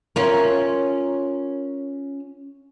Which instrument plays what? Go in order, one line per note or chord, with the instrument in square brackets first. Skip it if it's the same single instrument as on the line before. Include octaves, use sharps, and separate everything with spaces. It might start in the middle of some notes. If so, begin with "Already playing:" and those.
[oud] C#4 F4 A#4